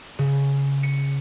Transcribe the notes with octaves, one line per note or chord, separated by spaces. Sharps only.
C#3
C#7